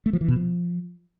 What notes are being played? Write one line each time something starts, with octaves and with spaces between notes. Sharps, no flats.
A3
F3
E3
B2
F3